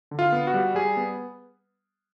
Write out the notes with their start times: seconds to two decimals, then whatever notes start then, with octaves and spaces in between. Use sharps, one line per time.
0.11 D3
0.19 F4
0.32 B3
0.47 F#4
0.54 G3
0.75 G3 G#4
0.97 B3